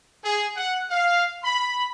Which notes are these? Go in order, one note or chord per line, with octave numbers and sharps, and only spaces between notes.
G#4
F#5
F5
B5